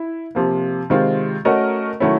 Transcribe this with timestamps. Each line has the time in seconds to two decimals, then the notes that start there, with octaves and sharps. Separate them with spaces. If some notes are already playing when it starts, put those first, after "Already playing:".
Already playing: E4
0.35 C3 F3 A#3
0.90 C3 D#3 G#3 C4 F4
1.45 A3 C#4 F#4 A#4 D#5
2.00 D#3 F#3 A3 C#4 E4